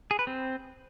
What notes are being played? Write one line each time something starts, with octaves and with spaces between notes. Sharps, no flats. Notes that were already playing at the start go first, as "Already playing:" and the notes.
G#4
B4
C4